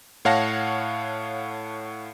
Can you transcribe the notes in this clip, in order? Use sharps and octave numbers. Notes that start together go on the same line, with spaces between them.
A2 C#5 F5 F#5 A5 A#6